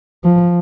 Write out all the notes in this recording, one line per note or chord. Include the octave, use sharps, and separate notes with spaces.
F3